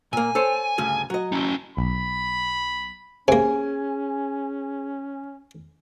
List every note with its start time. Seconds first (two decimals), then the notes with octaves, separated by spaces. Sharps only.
0.13 A#2 A#3 G#5
0.35 A4 C5 C#5
0.78 D2 G2 C#3
1.10 F#3 D#5
1.32 C#4 E4
1.77 B1 B5
3.28 C3 A#3 C#4 G#4 G#5